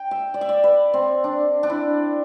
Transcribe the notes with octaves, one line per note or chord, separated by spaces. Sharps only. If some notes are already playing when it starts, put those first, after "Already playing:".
Already playing: G5
E5
D5
E5
D5
B4
C4
D4
D4
E4